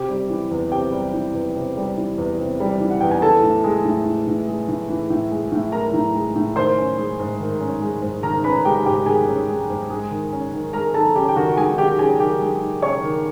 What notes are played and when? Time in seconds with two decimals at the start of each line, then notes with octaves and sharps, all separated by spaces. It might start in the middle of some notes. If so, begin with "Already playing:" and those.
Already playing: C3 G4
0.09 G3
0.30 E3
0.51 E2
0.72 C3 G4 G5
0.92 G3
1.13 E3
1.34 E2
1.55 C3
1.77 G3
1.97 E3
2.18 E2
2.39 C3
2.60 G3
2.80 E3
2.90 F#5
3.01 E2 G5
3.11 G#5
3.22 E3 A4 A5
3.43 A2
3.64 G#3
3.85 A2
4.06 E3
4.27 A2
4.48 G#3
4.68 A2
4.90 E3
5.10 A2
5.31 G#3
5.52 A2
5.72 E3 A#4 A#5
5.93 A2
6.15 G#3
6.35 A2
6.56 D#3 C5 C6
6.78 C#4
6.98 G#3
7.19 G#2
7.40 D#3
7.60 C#4
7.82 G#3
8.02 G#2
8.23 D#3 A#4 A#5
8.44 C#4 B4 B5
8.65 G#3 G4 G5
8.86 G#2 G4 G5
9.06 D#3 G#4 G#5
9.28 C#4
9.49 G#3
9.70 G#2
9.90 G#3
10.11 D#3
10.32 C#4
10.53 D#3
10.73 G#3 A#4 A#5
10.94 D#3 A4 A5
11.15 C#4 G4 G5
11.29 G5
11.36 D#3 F#4 F#5
11.57 G#3 G#4 G#5
11.78 D#3 G4 G5
11.99 C#4 G#4 G#5
12.20 D#3 G4 G5
12.41 G#3
12.61 D#3
12.82 C#4 C#5 C#6
13.03 D#3